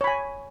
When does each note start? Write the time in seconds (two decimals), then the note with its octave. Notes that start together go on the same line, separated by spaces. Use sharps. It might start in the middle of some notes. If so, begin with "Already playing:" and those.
0.01 C#5
0.04 B5
0.07 G#5